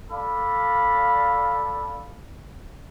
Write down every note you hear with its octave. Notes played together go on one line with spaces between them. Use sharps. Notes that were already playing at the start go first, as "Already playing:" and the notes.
A4 D5 F5 B5